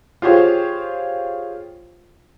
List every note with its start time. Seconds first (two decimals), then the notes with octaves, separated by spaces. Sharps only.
0.22 F4 G4 G#4 C5 C#5 F5